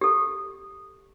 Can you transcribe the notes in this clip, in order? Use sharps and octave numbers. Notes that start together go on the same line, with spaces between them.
G4 A4